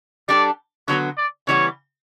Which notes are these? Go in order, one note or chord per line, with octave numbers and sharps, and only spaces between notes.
G3 D4 A4 D5
D3 F#3 B3 F#4 C#5
D5
C#3 E3 G3 B3 C#5